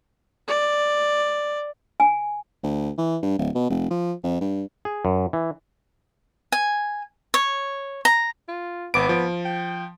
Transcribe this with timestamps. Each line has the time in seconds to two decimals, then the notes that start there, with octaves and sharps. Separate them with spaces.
0.48 D5
2.00 G#5
2.63 D2
2.98 E3
3.22 G2
3.38 D1
3.55 B2
3.70 F1
3.90 F3
4.23 F2
4.41 G2
4.85 G#4
5.05 F#2
5.33 E3
6.52 G#5
7.34 C#5
8.05 A#5
8.48 F4
8.94 G#1 B3 D6 D7
9.09 F3
9.45 G5